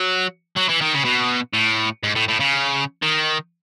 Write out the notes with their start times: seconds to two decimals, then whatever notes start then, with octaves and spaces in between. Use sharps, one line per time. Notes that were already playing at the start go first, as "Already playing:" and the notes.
Already playing: F#3
0.56 F#3
0.69 E3
0.81 D#3
0.94 C#3
1.05 B2
1.54 A2
2.03 G#2
2.15 A2
2.28 A2
2.40 C#3
3.02 D#3